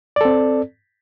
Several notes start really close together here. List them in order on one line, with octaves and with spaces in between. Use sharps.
D5 A4 C4